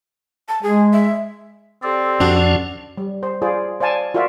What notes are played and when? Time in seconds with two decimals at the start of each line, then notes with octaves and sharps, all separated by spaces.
0.48 A5
0.63 G#3 G#4
0.93 E5
1.83 C4 G4 A4 D5
2.20 F2 F3 C#4 D4 F#4
2.98 G3
3.23 C5
3.42 F4 G#4 C5 D5
3.80 C5 D5 F5 G#5 A5
4.14 F4 F#4 A#4 D5 E5